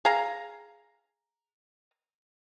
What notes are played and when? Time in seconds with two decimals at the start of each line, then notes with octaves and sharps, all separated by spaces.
0.05 G#4 F5 A#5